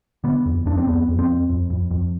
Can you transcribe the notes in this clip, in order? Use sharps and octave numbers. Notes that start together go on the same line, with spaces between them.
D3 B3
F2
F2 D4
C4
F2 B3
F2
C4
F2
F2
F2
F2